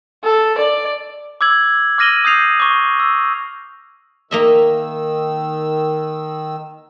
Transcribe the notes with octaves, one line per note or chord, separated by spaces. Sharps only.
A4
D5
D6 E6 G#6 F#7
D6 F6 A#6 D#7 F#7 G7
D#6 G6 C7 F7
C#6 D6
E6
D#3 A#3 D#5 E5 E6